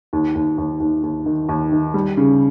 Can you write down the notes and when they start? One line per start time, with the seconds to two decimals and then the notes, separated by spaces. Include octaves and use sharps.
0.13 D#2
0.35 D#2
0.58 D#2
0.80 D#2
1.03 D#2
1.26 D#3
1.49 D#2
1.72 D#3
1.94 G3
2.17 C#3